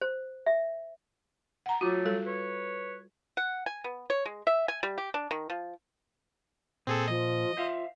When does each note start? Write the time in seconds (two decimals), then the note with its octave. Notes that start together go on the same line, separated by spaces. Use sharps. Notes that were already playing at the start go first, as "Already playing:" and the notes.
0.01 C5
0.46 E5
1.66 F#5 A#5
1.81 F#3 A3 F4 F#4
2.05 G3 A4
2.25 B4 C#5
3.37 F#5
3.66 G#5
3.84 B3
4.10 C#5
4.26 G#3
4.47 E5
4.68 G#5
4.83 G3
4.98 G4
5.14 D4
5.31 D#3
5.50 F3
6.87 A#2 C4 G#4 A4
7.08 F3 D#5
7.57 F4 C5 E5 F5